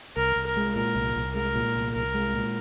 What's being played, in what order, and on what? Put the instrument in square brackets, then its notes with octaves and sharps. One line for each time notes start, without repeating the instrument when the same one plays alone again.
[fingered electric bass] C2 [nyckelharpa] A#4
[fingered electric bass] C2
[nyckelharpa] A#4
[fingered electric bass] G#3
[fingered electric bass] A#2 [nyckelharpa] A#4
[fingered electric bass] C2
C2
[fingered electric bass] G#3 [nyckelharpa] A#4
[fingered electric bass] A#2
C2
[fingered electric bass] C2 [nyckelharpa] A#4
[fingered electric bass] G#3
A#2